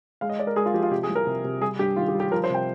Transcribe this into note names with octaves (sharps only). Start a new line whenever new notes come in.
G#3 F5
D#5
G#3 D5
A#4
G#3 G#4
F4
F3 G4
F4
C3 G4
G#4
C2
A#4
C3
C3
G3 G#4
G2 G4
D#3 F4
G4
G3
G4
F3 A#4
C5
C3 G5